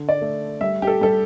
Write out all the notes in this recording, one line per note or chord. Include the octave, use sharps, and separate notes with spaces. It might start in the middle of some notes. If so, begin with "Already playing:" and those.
Already playing: D3
D5
A3
G3 E5
G4
A4
G3 A4